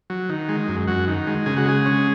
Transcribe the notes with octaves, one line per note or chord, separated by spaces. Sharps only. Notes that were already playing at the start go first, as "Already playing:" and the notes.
F#3
D#3
G#3
F#2
F#2 F#4
D#3
G#3
C#3 G#4
F#4
G#3 G#4
C#4